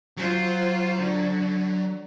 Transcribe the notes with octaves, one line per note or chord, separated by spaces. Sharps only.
F#3 F4 C5
D3